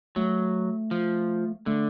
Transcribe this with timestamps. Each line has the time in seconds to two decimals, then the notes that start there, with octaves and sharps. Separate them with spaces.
0.16 F#3 A3
0.91 F3
1.66 D3 A3